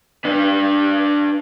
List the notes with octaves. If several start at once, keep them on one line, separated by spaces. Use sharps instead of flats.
D4 B4